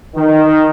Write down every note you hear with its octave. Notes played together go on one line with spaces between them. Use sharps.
D#3